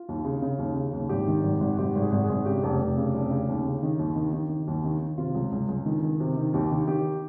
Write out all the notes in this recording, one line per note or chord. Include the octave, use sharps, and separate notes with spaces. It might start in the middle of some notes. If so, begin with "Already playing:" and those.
Already playing: F4
D#2
C#3
C#3
D#2
C#3
D#2
G#1 G4
D#3
G#1
G#1
G#1 G4
G#1
G#4
G#1
G#4
G#1
C#3 G4
F1
F1
C#3
F1
C#3
D#2
C#3
D#3
D#2
D#3
D#3
D#3
D#2
D#3
D#3
C3 F4
C#2
C#2
C#2
D#3
D#3
C3
D#3
D#2 G4
D#3
D#3 G4